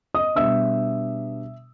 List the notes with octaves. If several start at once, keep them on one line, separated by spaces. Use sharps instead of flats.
D#5 D#6
B2 G3 B3 D4 E5 E6